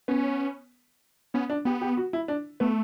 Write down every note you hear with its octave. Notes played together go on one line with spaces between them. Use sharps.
B3 C#4
B3 C#4
D4
B3 G4
G4
F#4
E4
D4
A3 B3